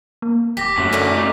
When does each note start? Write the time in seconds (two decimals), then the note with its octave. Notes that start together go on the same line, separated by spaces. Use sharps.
0.22 A#3
0.57 D#1 G4 D6 A#6 B6
0.78 F#2 A3 C#4 F#4
0.93 A#2 D3 D4
1.15 A3 D#4 F4